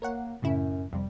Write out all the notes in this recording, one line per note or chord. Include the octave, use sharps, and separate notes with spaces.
A#3 A#4 C#5 F#5
F#2 A2 C#3 E4
F2 C3 G3